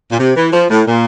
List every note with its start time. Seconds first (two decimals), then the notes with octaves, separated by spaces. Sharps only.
0.12 A#2
0.20 C3
0.37 E3
0.53 F3
0.70 A2
0.87 A#2